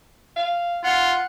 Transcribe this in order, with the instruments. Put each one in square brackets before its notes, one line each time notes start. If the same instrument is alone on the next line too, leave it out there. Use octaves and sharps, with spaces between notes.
[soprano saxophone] F5
[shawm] F4 [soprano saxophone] F#5